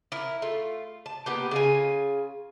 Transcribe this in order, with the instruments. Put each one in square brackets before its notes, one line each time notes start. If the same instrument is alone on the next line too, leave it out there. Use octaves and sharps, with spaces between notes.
[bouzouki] E4 A#4
A3 F4
A5
A#3 B3 G4
C#3 F4 G#5